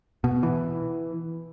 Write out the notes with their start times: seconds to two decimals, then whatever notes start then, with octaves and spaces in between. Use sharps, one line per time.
0.24 B2
0.43 E3